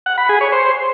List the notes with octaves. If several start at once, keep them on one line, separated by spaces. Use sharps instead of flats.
F#5
B5
G#4
C#5
C5